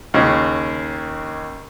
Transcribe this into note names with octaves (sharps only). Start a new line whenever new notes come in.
D#2 C#3